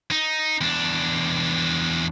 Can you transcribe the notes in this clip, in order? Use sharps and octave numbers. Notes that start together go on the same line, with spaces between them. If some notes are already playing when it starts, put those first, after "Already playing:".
D#4
E2 D4